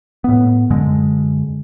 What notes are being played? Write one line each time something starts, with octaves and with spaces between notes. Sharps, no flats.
A2 B3
F#2 D3 G#3